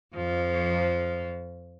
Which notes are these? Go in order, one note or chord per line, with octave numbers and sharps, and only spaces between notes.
F2 F3